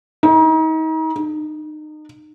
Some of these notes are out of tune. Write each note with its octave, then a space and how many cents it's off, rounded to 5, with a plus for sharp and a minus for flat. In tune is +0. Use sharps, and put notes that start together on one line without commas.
D#4 +35
D#4 -30